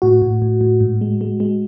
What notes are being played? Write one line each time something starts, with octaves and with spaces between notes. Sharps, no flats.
A2 F#4
A2
A2
A2
G#2
G#3
G#3
G#3